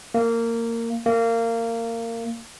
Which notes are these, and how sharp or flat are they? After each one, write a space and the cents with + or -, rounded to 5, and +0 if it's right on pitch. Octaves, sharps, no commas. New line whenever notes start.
A#3 -20
A#3 -25